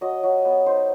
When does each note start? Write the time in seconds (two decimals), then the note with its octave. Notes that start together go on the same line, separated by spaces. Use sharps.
0.01 F#3 D#5
0.23 F#3
0.45 B3
0.66 D#4 C5